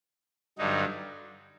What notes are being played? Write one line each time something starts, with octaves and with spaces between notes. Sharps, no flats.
G2 D3 F#3 D#4